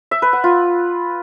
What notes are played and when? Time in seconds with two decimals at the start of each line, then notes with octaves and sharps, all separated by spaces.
0.11 E5
0.22 B4
0.33 F#5
0.44 F4